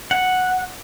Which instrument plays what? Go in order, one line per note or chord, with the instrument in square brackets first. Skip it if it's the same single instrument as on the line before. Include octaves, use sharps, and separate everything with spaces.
[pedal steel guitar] F#5